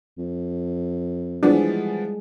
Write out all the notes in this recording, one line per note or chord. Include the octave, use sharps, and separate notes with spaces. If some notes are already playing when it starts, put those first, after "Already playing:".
F2
E3 F3 G3 G#3 B3 D4 G#4